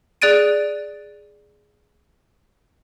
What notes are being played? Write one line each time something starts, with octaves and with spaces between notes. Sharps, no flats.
G#4 D5 F#6 A6 D7 D#7